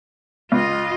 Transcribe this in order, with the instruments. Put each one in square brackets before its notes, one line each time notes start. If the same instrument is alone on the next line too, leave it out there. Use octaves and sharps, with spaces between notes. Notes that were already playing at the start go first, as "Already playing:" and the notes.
[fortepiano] C#2 [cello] F4 D#5